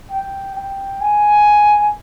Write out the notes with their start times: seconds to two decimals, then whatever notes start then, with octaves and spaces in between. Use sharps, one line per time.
0.11 G5
0.56 G5
1.01 G#5